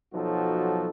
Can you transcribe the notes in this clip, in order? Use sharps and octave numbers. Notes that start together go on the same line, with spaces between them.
B1 F3 F#3 D#4 F#4 A4